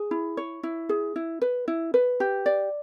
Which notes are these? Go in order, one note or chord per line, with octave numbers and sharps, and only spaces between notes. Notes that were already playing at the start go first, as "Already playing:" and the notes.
Already playing: G#4
E4
C#5
E4
G#4
E4
B4
E4
B4
G4
D5